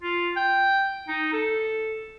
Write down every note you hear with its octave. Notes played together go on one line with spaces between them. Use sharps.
F4
G5
D#4
A4